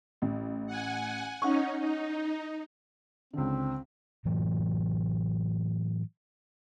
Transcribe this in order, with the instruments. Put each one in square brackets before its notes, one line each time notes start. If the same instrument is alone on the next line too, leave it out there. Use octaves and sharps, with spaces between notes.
[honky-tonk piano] A1
[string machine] F#5 G#5
[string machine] C#4 D#4 [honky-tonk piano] F#5 C#6
[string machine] D#4
[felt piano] C#2 D3 [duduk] C4
[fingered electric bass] A2 E3 F#3